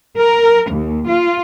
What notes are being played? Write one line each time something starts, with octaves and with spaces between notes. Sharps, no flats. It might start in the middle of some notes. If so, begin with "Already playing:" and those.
A#4
D#2
F4